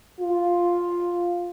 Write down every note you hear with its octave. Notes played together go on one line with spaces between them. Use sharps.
F4